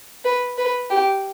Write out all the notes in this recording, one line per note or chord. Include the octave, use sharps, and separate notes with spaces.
B4
B4
G4